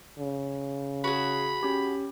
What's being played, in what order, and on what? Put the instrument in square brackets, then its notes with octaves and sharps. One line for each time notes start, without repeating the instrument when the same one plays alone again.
[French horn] C#3
[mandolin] F#4 G#4 [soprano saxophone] B5
[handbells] C#4 G4